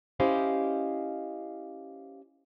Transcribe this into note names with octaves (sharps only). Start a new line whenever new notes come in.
C#4 E4 G4 C5 D#5 F5